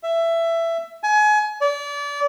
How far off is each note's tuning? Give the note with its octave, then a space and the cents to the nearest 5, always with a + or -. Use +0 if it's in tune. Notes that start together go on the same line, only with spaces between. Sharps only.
E5 +15
G#5 +30
D5 -30